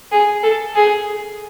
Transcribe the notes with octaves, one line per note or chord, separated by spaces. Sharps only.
G#4
A4
G#4